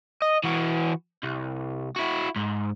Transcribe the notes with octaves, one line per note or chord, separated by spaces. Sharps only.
D#5
E3 F#4
C2
E4 F#4
G#2